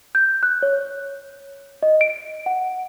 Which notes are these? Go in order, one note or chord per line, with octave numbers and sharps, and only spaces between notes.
G6
F#6
C#5
D#5
D7
F#5